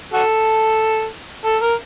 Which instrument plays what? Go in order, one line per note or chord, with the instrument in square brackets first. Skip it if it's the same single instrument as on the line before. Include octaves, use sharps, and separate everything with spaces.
[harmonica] F#4 A4
A4
A#4